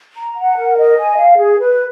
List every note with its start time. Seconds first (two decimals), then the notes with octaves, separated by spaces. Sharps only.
0.17 A#5
0.37 F#5
0.57 A#4
0.78 D#5
0.97 G#5
1.18 F5
1.38 G#4
1.59 B4